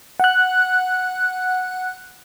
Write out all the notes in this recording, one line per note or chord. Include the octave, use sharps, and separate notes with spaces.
F#5 F#6